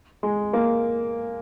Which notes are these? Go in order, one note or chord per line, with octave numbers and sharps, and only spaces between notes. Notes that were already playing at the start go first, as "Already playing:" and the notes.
G#3
A#3